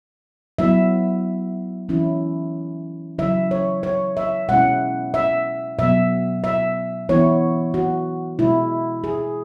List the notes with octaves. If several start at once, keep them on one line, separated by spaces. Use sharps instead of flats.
F#3 B3 E4 E5
E3 C#4 E4
C#3 F#3 E4 E5
C#5
C#5
E5
B2 G#3 C#4 E4 F#5
E5
B2 F#3 B3 E5
E5
E3 B3 E4 C#5
F#4
B2 G#3 E4
G#4